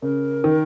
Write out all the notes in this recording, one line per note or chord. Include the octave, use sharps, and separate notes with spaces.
C#3 A#4
D#3